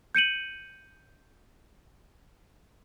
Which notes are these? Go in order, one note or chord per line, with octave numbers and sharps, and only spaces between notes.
G6 C#7 D#7 F#7